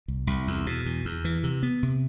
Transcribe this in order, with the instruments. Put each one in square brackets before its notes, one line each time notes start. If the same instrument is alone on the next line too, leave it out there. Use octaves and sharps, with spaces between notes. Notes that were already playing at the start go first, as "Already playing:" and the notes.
[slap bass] C2
C2
E2
B2
E2
E2
E3
C3
B3
C3